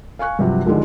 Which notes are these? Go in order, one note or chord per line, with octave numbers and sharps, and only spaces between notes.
F5 G#5 C#6 F#6
G2 C3 F3 F#3
C2 D3 D#3 F3 G3 G#3